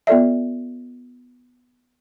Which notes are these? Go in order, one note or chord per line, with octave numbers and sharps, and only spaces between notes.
B3 F4 A4 D5 E5